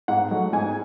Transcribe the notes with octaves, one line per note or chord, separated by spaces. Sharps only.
G#2 F#5
F#3 A3 D#4
G#2 G#5